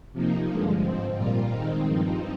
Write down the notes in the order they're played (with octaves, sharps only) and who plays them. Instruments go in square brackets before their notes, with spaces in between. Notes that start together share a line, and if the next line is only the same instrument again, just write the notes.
[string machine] C3 F3 A#3 D#4
G2 D3 F3 G#3
G#2 F3 C4
A#2 G3 A#3 F4
D#3 G#3 C4 D#4
G2 F3 C4 D#4